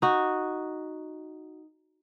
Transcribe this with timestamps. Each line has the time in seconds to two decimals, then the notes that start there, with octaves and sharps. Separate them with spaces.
0.02 D#4 F#4